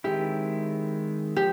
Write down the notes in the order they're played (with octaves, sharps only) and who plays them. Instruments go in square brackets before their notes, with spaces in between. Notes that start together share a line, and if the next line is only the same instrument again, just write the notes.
[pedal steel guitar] D#3 G#3 C4 E4 [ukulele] G4
[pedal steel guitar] F3 [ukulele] G4